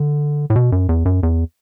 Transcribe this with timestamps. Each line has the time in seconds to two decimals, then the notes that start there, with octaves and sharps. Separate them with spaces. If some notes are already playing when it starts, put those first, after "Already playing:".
Already playing: D3
0.50 A2
0.56 B2
0.72 F#2
0.89 E2
1.05 F#2
1.23 E2